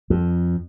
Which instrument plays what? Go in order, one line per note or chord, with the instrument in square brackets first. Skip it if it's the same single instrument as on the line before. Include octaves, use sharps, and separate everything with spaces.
[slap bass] F2